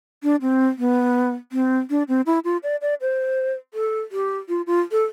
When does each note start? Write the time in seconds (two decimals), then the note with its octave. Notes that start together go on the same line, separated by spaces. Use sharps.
0.23 D4
0.41 C4
0.78 B3
1.52 C4
1.90 D4
2.08 C4
2.26 E4
2.44 F4
2.63 D5
2.81 D5
3.01 C5
3.74 A4
4.12 G4
4.49 F4
4.67 F4
4.92 A4